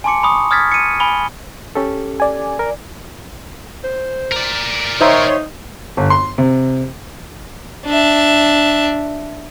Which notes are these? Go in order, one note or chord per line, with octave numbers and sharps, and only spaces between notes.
G#5 A5 C6 D6 C#7
B5 C#6 D#6
D#6 F6 G#6 A6 B6
C#7 D#7
G#5 B5 G7
C#4 G4 A4
D5 G#5
A#4
C5
A#4 D5
D#3 D#4 C5 C#5 E5 A#5 C6
G1
C6
C3
D4 E5